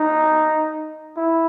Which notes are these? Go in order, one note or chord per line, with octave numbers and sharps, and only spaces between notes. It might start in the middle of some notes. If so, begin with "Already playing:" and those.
Already playing: D#4
E4